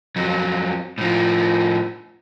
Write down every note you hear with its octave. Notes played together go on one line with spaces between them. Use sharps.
F2 F#3
A2 F3